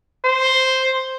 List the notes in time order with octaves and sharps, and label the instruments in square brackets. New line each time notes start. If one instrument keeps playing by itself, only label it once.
[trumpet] C5